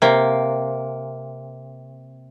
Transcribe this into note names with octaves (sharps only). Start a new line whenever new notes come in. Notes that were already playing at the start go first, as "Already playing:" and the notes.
C3 A#3